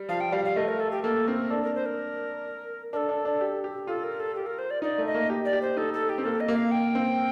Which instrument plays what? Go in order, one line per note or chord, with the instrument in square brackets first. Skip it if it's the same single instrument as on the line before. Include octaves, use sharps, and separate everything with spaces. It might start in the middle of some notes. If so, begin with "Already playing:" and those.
Already playing: [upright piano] G3
[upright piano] F3 [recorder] F5
[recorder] G5
[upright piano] G3 [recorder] F5
[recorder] F5
[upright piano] A3 [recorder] D#5
[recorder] A#4
A4
G4
[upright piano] A#3 [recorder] A4
[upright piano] C4 [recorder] A#4
[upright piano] D4 [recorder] A4
[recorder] A#4
C5
A#4
[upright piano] D4 [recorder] A4 A#4
[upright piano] D4
D4
G4
G4
[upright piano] F4 [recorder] A4
[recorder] A#4
A4
G4
A#4
C5
D5
[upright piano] D#4 [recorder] D5
[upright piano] A3
[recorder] D#5
[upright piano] A#3
G4
[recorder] D5
[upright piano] G4
[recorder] C5
[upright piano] D#4 [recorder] A4
[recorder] A4
G4
[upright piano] C4
[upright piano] A#3 [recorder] A4
[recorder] D#5
[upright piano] A#3
[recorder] F5
G5
[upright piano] C4